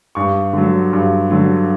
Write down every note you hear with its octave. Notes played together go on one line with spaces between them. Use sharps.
G2 C#6
D3 F#3
G2
D3 F#3